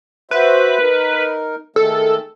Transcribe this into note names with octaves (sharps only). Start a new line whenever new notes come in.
F#4 B4 C5 E5
D#4 A#4
D#3 G#3 A3 A4